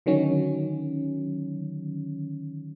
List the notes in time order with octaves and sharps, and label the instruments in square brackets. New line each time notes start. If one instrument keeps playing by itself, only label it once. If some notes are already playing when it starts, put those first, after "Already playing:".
[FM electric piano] D3 D#3 F#3 C#4